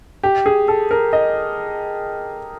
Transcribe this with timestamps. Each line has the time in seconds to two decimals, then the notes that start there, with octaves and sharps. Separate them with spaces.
0.23 G4
0.46 G#4
0.68 A4
0.91 A#4
1.13 D#5